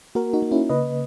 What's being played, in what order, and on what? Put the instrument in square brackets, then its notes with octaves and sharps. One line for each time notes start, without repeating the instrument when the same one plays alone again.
[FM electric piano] A#3 F#4 A#4
D#4 F#4
A#3
C#4 E4
C#3 B4 D#5